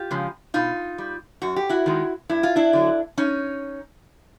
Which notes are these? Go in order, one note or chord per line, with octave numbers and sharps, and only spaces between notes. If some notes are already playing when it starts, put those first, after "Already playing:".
Already playing: F4 G4
C#3 F3 G#3
B2 D#4 F4
G3
F#2 F#4
G4
E4 F#4
D#3 G#3
G2 E4
F4
D4 E4
D3 F#3
C#4 D#4